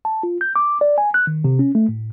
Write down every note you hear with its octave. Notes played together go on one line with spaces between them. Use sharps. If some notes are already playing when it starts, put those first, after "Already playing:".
A5
F4
G6
D6
D5
G#5
F#6
D#3
C3
C#4
A3
A2